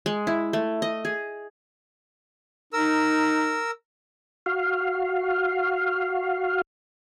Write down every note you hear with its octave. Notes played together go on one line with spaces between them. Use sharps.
G#3
E4
A3
D#5
G#4
D#4 A#4 E6
F#4 F5